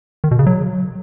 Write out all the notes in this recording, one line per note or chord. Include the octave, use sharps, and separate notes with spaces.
D#3
B2
C#3
F#3